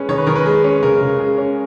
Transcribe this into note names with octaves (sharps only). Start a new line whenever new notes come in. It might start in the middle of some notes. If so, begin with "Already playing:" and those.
Already playing: G#3 C#4 B4
D#3 C#5
B4
D#3 A#4
B4
G#3
C#4
C#3 A#4
C#3
G#3
C#4